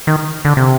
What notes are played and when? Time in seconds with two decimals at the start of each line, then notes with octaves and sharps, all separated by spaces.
0.07 D#3
0.45 D3
0.57 C3